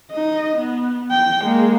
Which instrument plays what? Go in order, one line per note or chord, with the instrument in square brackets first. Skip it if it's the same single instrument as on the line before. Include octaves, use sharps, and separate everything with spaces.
[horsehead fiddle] D#4 D#5
B3
G5
G#3 A#3